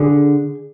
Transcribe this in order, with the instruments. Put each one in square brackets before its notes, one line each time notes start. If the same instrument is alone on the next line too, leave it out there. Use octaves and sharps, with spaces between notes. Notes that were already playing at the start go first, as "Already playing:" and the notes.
Already playing: [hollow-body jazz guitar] D3 G#4